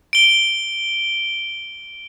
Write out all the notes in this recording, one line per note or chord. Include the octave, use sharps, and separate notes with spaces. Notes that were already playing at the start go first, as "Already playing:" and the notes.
D7 G7